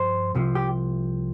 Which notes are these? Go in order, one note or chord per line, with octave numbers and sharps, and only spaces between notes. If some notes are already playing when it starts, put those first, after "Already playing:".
Already playing: G2 F3 C5
C2 C3 F3
G4